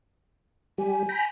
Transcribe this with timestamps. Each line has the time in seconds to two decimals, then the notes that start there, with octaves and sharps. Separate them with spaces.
0.78 G3 G4 G#5
1.09 G5 A#5 B5